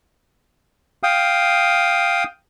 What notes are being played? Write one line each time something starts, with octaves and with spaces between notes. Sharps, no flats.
F5 G5 D#6